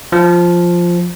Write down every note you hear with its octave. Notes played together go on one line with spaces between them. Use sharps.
F3